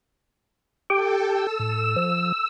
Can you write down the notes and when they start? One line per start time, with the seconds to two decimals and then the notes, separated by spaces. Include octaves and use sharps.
0.90 G4 A4 G5
1.26 E6
1.60 A2
1.96 F3